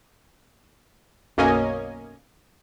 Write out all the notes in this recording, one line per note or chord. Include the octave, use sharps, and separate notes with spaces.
B1 F#2 A#3 C#4 D#5 G#5